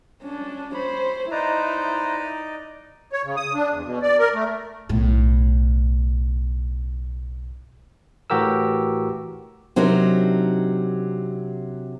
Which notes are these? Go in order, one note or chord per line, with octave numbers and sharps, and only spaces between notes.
C#4 D4
C5 C#5 B5
D#4 E4 B4 C5 D5 D#5 A#5
C#5
C#3
D#6
D4
E2
B2
D5
A#4
A3
B1 A2
A2 E3 F#4 G4 A#4 E6
C3 F#3 D4 D#4 A#4